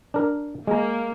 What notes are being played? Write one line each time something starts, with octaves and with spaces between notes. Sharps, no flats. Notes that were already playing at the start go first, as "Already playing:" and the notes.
D4 A#4
G#3 A#3 A#5